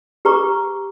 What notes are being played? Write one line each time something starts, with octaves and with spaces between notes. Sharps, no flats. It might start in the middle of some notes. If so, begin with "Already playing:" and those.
G4 B4 A#5 C#6 D6